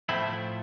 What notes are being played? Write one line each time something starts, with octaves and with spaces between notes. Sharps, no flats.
A2 F3 A3 C4 E4